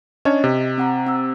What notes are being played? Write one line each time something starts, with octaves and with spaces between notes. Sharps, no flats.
C#4 D4 C#5 D#5
C3
C4 F#5 A#5
C4 E6